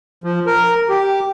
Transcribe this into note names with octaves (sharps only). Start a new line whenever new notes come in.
F3
A#4
G4